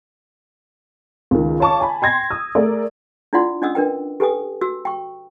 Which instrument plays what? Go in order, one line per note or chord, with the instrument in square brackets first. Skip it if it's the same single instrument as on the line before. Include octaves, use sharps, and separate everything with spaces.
[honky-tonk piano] C#2 D#3
C#5 F5 A5 C#6 D6
G#5 A5 B5
G5 C6 G#6 A#6
D#6 E6
A3 G#4 A#4 D5
[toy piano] D4 E4 F4 D5 F#5 C6
C#4 D4 D#5 F#5 D#6 E6
D4 A#4 B4 G5
G4 A4 B4 G5 G#5 D#6
F#4 E6
G5 C#6